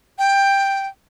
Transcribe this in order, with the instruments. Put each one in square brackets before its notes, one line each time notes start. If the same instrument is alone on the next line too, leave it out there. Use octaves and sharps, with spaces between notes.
[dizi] G5